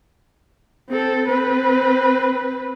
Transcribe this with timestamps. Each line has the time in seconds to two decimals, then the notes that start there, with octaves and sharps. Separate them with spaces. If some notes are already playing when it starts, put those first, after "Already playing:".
0.89 C4 A4
1.28 C4 B4